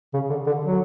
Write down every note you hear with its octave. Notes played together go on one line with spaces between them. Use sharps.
C#3
D3
D3
F#3